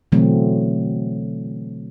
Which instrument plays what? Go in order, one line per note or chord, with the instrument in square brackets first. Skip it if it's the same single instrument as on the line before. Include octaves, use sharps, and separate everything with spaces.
[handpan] B2 D3 E3 F#3 A3 C4